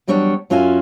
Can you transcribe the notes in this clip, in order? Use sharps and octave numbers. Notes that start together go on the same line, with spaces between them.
E2 F#3 G3 D4 C#5 F#5
F#2 C#4 F4 F#4 E5 G#5